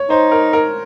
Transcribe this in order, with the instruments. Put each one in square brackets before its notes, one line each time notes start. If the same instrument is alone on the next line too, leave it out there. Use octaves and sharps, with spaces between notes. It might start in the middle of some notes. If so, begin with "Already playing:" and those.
Already playing: [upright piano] C#5
[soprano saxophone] D#4 [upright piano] C5
[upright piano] A#4
A#4